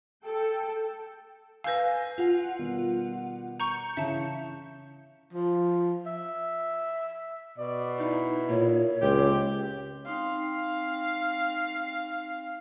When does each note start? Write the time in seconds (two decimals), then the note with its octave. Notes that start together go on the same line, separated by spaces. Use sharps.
0.25 A4 G5
1.64 B4 F5 G#5 E6 G6 A#6
2.18 F4 F#5
2.59 B2 D#3 G3
3.60 A#5 C#6 G6 C#7
3.97 C#3 E3 E5 A5
5.33 F3
6.06 E5
7.58 B2 D5
7.99 D#4 E4
8.49 A#2 C#5
9.02 C#2 C4 G4
10.06 C4 D#4 F5 G5